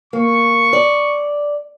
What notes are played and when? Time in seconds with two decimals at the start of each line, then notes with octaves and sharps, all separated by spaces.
0.13 A#3 C#6
0.73 D5